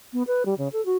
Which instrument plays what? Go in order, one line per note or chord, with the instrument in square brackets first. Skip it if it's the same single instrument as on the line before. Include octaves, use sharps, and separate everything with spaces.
[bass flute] B3
B4
G3
C#3
A4
F#4